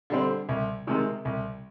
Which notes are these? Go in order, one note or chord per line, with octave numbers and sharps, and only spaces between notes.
D3 G3 C4
C2
C3 D#3 G#3
C2